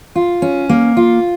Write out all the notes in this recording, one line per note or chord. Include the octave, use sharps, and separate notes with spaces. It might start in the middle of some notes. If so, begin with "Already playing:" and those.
F4
C#4
A#3
F4